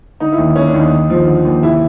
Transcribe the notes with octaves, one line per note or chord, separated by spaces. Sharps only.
D3 D#4
E4
D#2
D#2 C#4
D4
D#2
D#4
D#2
F3
D3
D#2
C3 E4